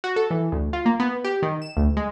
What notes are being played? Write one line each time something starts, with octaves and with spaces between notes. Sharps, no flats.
F#4
A4
E3
D2
F4
A#3
B3
G4
D#3
E7
D2
G#3